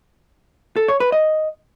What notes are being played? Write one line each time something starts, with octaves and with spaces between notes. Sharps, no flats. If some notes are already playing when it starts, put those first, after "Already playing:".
A4
C#5
B4
D#5